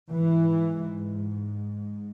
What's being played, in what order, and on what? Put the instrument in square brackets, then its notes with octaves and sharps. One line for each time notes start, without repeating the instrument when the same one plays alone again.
[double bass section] G#2 E3